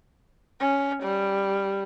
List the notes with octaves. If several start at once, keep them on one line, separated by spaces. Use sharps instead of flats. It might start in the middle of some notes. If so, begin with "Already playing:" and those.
C#4
G3